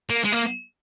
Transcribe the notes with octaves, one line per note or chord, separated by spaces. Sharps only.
A#3
G#3
A#3